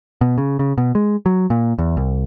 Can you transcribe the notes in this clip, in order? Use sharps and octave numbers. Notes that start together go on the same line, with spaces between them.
B2
C#3
C#3
B2
G#3
F#3
A#2
E2
C2